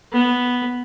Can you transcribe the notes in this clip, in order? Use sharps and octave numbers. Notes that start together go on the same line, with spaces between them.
B3